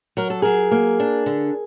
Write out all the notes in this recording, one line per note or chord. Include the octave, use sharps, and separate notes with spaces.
F#3 A#4
A4
F#3 G#4 A#4
A#3
D4
D3